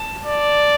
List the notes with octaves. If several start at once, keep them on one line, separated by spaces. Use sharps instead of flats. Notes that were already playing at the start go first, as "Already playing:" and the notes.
Already playing: A5
D5